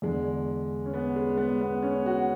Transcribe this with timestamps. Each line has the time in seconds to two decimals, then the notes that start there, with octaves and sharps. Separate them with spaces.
0.02 E2 D3 G#3
0.86 C#4
0.93 B3
1.16 G#3
1.37 B3
1.61 B3
1.83 C#4
2.06 F#4